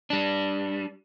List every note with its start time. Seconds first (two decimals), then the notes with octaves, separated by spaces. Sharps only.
0.10 G3 D4